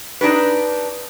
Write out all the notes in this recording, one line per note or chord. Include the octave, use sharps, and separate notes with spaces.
D4 D#4 G4 B4